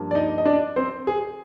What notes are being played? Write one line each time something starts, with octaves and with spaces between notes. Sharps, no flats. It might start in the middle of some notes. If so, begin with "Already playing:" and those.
Already playing: G2 F3 A#3
D5
D#4 D#5
D#5
D4 D5
C4 C5
G#4